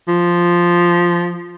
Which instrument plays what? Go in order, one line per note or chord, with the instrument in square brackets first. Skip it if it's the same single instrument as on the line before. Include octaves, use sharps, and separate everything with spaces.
[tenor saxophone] F3